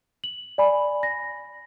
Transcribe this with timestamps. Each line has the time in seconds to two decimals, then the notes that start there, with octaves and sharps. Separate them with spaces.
0.24 F#7
0.58 D5 G#5 B5
1.03 A#6